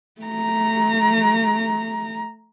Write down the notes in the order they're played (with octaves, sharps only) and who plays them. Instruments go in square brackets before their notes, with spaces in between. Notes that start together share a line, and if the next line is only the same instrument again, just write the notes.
[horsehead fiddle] A3 A#5